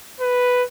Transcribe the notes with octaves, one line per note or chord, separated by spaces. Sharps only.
B4